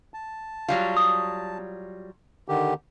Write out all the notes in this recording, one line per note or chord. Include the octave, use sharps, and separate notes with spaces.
A5
F#3 G3 F4
D#6
D3 D#3 G4